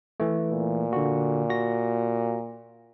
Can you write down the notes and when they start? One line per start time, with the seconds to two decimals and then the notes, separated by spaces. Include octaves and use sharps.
0.20 E3 A3
0.51 A#2
0.93 D3 F#4
1.49 F#4 A#6